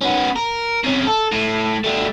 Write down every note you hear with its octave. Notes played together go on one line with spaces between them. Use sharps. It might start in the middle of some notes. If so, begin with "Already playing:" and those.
B3 C#4
A#4
C3 C#4
A4
A2
G3 A3